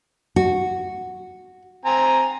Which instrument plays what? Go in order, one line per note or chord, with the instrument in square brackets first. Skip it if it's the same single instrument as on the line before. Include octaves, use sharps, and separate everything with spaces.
[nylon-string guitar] F#4
[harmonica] C4 G#5 A#5